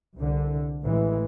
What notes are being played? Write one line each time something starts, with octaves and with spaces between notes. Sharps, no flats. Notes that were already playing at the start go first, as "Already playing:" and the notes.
C2 D3
A1 E3 G#3